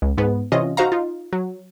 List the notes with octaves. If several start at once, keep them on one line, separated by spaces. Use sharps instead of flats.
C#2
G#2 B3
C3 E3 C#4 F4 D#5
D#4 F#4 C5 F5 A#5
D#4 F4
F#3